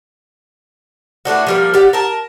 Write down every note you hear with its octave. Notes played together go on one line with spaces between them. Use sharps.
E3 A3 D4 F#4
F3 G3 A#3
G4 D5 F#5
A#4 A5